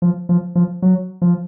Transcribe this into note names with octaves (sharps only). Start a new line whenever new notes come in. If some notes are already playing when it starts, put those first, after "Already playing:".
F3
F3
F3
F#3
F3